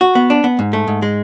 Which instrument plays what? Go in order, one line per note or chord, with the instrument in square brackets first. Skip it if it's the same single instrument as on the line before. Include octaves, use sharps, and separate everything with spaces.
[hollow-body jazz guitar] F#4
B3
D4
B3
G#2
A3
G#2
G#3